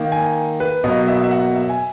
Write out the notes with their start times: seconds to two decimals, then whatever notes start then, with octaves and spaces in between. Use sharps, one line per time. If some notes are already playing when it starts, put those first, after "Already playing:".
Already playing: D#3 A#3
0.12 G#5
0.60 B4
0.84 B2 F#3 A#3 D#5
1.08 E5
1.24 E5
1.31 F#5
1.56 E5
1.69 G#5